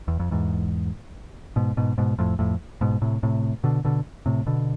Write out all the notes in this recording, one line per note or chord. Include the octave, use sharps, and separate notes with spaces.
E2
F2
E2 G#2
G#2 B2
G#2 B2
G#2 B2
F2 A2
F2 A2
G#2 B2
A2 C3
A2 C3
B2 D3
B2 D3
A2 C3
B2 D3